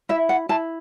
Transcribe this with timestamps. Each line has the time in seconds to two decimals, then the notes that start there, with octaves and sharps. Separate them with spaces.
0.09 E4 E5
0.29 F#5
0.49 E4 A5